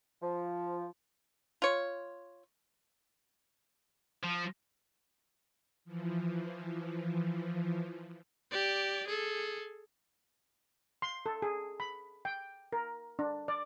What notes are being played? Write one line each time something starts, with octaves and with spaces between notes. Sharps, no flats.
F3
F4 C#5
F3
E3 F3
G4 D5
G#4 A4
C6
A4
G#4
B5
G5
A#4
D4
D5